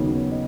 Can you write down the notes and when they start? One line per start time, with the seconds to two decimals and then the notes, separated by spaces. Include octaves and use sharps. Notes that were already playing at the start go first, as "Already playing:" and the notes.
Already playing: D#2 C#3 F#3 B3 D#4
0.31 D#5